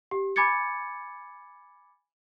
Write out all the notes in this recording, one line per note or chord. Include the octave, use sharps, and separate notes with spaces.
G4
G#5 B5 D6 G#6 A6 C#7